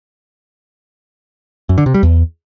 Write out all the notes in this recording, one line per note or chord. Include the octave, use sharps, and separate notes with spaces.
F#2
D3
C3
G3
E2